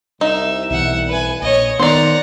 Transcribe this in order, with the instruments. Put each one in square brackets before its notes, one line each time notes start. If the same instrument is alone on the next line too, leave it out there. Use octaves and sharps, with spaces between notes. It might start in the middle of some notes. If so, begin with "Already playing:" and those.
[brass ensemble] C2 [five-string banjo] D#4 [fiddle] E5
[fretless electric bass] B1 E3 [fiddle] E5 F#5
[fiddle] B4 G#5
[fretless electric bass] A#1 [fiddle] C#5 D#5
[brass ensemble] D#3 [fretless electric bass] B3 [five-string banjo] C5 D5 [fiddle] F#5 A#5